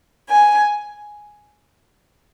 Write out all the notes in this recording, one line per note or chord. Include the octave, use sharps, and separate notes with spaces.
G#5